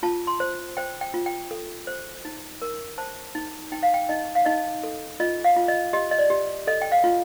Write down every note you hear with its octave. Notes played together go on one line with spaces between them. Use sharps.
F4 A5
C6
C5
C5 G5
G5
F4
G5
A4
C5
D#4
A#4
C5 A5
D#4
D#4 G5
F5
G5
D#4 D#5
F5
D#4 D#5
A4
F4 D#5
F5
F4
D#5
G4 D#5
D#5
D5
G4
A4 D#5
G5
F5
F4